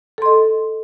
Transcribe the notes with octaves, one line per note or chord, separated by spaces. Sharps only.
A4 D#5 C6